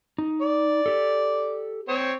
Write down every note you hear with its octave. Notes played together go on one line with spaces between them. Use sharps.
D#4
D5
G4 A4
C4 C#5